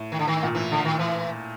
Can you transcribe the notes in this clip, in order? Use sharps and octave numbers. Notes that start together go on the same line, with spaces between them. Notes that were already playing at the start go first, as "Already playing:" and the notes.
Already playing: A2
D#3
D3
D#3
A#2
A2 E3
D3
D#3
E3